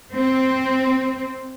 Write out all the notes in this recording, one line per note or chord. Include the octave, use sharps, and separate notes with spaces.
C4